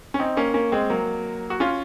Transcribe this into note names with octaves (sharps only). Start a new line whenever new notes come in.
C#4
C4 D#4
A#3 C#4
A#3 C#4
G#3 C4
F#3 A#3
F#4
C#4 F4